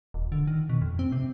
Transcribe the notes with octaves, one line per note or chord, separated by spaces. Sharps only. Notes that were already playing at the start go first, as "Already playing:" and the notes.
D#1
D3
D#3
B2
F2
C4
C3